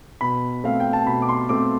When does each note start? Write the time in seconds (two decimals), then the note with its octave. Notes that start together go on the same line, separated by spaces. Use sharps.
0.21 B2 B5
0.64 A3 C4 F5
0.80 G5
0.93 A5
1.06 B2 B5
1.22 D6
1.29 C6
1.49 A3 C4 D6